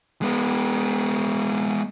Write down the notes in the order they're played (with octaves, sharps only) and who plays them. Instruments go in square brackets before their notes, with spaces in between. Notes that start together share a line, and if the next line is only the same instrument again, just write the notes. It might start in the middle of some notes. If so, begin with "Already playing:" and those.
[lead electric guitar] G#3 B3